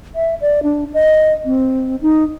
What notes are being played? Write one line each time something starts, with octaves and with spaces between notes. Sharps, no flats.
E5
D5
D4
D#5
C4
D#4